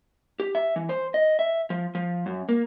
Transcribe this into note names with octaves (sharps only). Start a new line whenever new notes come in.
G4
E5
E3
C5
D#5
E5
F3
F3
F#2
A#3